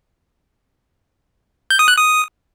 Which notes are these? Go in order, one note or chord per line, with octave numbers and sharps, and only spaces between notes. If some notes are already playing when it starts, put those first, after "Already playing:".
G6
D#6
F#6
D#6